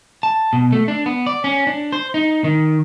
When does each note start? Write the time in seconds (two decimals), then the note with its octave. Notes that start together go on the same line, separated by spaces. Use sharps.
0.23 A5
0.53 B2
0.72 A3
0.88 D4
1.06 B3
1.26 D5
1.44 C#4
1.67 D4
1.93 C5
2.14 D#4
2.44 D#3